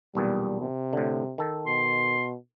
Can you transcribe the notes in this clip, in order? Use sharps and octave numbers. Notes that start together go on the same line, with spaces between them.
B1 E2 A#2 G3
C3
A2 D3
D#3 A4
B2 C6